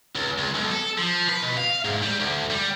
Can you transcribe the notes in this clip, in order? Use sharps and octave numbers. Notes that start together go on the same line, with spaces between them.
C#2
C#2
B1
A4
F3
B4
B2
F5
G#2
G3
D2
G3